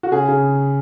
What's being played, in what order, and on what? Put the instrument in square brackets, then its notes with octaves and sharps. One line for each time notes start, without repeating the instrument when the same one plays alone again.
[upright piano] F#4
C#3 G#4
C#3